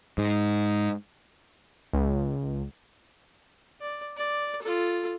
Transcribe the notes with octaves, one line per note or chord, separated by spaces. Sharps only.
G#2
C#2
D5
D5
F4 A4